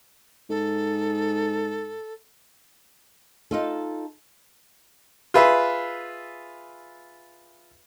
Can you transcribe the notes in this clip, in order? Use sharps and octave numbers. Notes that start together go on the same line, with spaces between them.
G#2 A4
D#4 F4 A4
F4 G#4 B4 E5